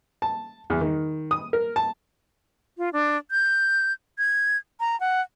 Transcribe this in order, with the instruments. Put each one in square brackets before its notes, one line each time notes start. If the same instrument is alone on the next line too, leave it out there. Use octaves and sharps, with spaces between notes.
[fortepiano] A5
E2
D#3
D#6
A#4
A5
[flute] F4
D4
G6
G#6
A#5
F#5